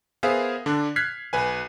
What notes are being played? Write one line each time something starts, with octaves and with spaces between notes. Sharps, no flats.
B3 G#4 A#4 C5 E5 F5
D3 D4
F6 F#6 G#6 B6 C7
B1 B4 G#5